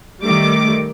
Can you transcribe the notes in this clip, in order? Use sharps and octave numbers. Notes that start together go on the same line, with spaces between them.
D#3 G3 A3 D6